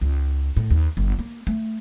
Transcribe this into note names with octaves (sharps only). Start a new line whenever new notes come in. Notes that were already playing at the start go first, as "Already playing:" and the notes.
C#2
A2
D#2
G1
A#3
A3